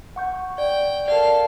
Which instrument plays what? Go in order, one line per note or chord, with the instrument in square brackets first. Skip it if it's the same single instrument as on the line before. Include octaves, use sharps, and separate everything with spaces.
[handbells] F#5 C#6 G6
[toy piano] D5 [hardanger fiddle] G5
[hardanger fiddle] A4 F5 [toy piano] A#4 D5